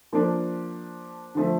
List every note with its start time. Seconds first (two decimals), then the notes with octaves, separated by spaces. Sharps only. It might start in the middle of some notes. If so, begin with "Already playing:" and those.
0.13 F3 A#3 D4
1.35 D3 F3 A3